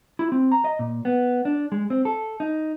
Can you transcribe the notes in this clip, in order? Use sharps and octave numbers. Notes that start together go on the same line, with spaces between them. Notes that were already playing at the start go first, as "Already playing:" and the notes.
E4
C4
A#5
D#5
A#2
B3
D4
G#3
C4
A4
D#4